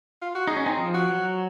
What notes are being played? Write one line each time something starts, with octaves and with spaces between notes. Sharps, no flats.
F4
F#4
D#4 G#4
C#4
C4 D#4
F3
F#4
F#3